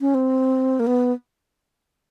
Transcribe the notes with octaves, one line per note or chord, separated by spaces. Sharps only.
C#4
C4
A#3
B3